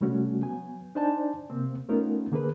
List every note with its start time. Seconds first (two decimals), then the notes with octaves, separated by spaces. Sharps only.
0.01 C3 G3 A3 C#4 F#4
0.42 F#3 B3 G#5
0.95 D4 D#4 C5 D5 G#5 A5
1.50 C3 A#3 C4
1.89 A3 B3 C#4 D#4 F4 A#4
2.32 D3 A#3 G#4 A#4 B4